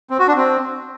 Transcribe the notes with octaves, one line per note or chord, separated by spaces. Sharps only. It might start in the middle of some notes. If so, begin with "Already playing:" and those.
C4
F#4
D4
C4